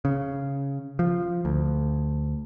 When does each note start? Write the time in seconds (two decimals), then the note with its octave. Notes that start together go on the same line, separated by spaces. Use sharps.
0.05 C#3
0.99 F3
1.45 D2